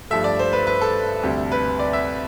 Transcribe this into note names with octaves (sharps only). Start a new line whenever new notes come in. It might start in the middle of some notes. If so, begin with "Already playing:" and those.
G2 F3 A3 E5
D5
C5
B4
B4
A4
D2 C3 G3
B4
D5
E5